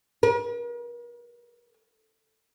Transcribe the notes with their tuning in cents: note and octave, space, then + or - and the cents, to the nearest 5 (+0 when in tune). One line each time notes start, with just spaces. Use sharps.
A#4 +45